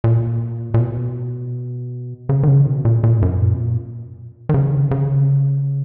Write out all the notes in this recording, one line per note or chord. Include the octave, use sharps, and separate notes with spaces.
A#2
A#2
B2
C#3
D#3
C#3
B2
A#2
A#2
G#2
F#2
A#2
B2
A#2
D#3
C#3
D#3
C#3